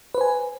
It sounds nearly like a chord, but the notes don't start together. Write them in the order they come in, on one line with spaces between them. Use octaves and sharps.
B4 C5 G#5